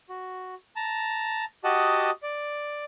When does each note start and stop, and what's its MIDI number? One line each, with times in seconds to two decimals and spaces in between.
0.09 0.55 66
0.76 1.45 81
0.76 1.45 82
1.64 2.10 66
1.64 2.10 67
1.64 2.10 75
1.64 2.10 78
1.64 2.10 81
1.64 2.10 87
2.23 2.84 74